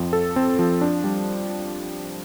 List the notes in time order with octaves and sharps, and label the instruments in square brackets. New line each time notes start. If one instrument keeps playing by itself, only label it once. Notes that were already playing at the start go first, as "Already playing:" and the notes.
Already playing: [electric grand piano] F2 F3 C4
A4
C4
F3
D4
G3